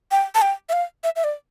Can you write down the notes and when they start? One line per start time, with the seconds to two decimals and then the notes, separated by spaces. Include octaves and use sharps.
0.11 G5
0.35 A5
0.42 G5
0.69 E5
0.73 F5
1.04 E5
1.16 E5
1.24 D5